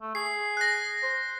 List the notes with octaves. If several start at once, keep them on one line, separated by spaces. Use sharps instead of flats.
A3
G#4 C7
F#6 A#6
C5